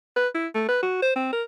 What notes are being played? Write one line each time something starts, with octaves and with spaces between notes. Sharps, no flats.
B4
E4
A3
B4
F#4
C5
C4
A#4